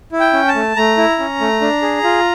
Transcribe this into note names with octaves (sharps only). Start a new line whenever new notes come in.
E4
G5
C#4
A5
A3
A3 A#5
E4
C#4
A3
D4
G#4
F4